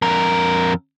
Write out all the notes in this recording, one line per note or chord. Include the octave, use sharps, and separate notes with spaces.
F2 A#4